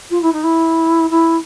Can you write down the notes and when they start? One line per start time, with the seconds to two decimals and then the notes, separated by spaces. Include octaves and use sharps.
0.10 F4
0.22 E4
0.32 D#4
0.43 E4
1.10 E4